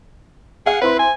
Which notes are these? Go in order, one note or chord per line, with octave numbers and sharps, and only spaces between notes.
G#4 F5 F#5
C4 E4 B4 C6
G#5